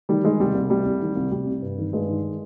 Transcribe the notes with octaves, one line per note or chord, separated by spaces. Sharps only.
D#3 G3
D#3 G#3
C2 G3
C2
C3 G3
C2
D#3
C2
C2 G3
C3
G2
D#3
G2 G#3
D#3